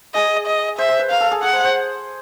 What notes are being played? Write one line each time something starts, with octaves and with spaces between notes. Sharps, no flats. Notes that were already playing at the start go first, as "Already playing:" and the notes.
G#4 D#5
D#5
C5 E5
C5
B4
A#4 F5
A4
G#4
G#4 F#5
C5
C5